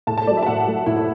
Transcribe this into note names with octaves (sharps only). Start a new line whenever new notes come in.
A2 A5
A5
F#3 A3 D5
E5
A5
A2 F#5
F#3 A3
A2 E4
E4